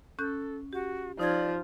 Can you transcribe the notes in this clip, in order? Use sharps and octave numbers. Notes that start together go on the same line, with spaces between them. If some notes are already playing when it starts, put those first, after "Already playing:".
C#4 A4 F#6 G6
F#4 G4
F3 D#4 D5 G#6